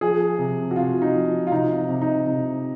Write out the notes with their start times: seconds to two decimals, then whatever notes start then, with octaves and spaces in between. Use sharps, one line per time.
0.01 F3 G#4
0.39 C3
0.71 F#4
0.76 C3 F4
1.02 D#4
1.14 F3
1.47 F4
1.51 C3 D#4
1.89 C3
2.02 D#4
2.27 C3